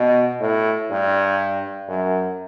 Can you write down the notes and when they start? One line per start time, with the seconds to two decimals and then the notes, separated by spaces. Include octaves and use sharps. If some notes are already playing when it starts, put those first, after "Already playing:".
Already playing: B2
0.40 A2
0.91 G2
1.89 F#2